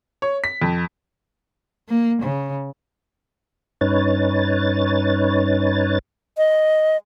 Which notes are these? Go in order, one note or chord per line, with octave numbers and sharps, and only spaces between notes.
C#5
B6
F2
A#3
C#3
G2 C#4 D#4 B4 C#5 A6
D#5